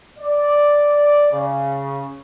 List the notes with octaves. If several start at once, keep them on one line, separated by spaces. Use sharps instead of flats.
D5
C#3